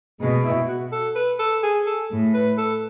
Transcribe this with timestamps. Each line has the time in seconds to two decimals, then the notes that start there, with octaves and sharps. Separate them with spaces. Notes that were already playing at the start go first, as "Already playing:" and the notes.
0.20 B2 G#3
0.44 E4
0.68 F#4
0.92 A4
1.15 B4
1.39 A4
1.63 G#4
1.87 A4
2.10 A2
2.34 B4
2.58 A4